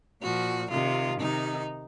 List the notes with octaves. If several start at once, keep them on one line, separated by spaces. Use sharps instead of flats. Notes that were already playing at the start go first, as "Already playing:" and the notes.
A#2 F3 F#4
C3 D#3 F4
C3 D#3 D#4